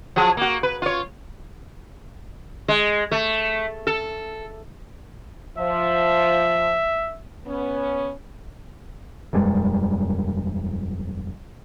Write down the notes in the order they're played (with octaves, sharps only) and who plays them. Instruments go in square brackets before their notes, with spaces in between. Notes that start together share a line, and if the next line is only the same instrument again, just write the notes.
[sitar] F3 F#3 G#4
A#3 F#4
B4
F4 C#5
G#3
A3
A4
[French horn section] F3 [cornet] E5
[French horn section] B3 C#4
[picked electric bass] E1 F#2 G3 G#3